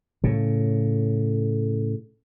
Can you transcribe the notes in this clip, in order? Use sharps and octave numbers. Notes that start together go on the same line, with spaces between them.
A2 C#3